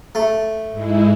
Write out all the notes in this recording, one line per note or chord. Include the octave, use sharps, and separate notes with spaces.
A3
G#2 G#3 E4